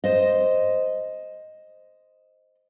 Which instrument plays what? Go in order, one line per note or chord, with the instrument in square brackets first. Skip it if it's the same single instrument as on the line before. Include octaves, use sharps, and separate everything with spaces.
[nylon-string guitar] C5 D#5